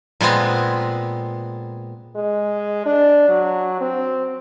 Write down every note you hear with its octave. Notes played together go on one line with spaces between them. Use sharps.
A#2 G#3 B3 C4
G#3
D4
F#3
C4